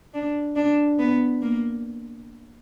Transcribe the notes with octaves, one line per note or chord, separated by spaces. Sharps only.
D4
D4
B3
A#3